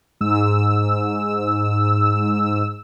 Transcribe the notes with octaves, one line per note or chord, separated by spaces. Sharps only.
G#2 E6